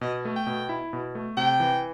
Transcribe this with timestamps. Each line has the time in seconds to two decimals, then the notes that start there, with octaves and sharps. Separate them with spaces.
0.01 B2 D#5
0.25 A3
0.36 G5
0.47 B2
0.69 E4
0.93 B2
1.15 A3
1.37 C3 G5
1.60 E3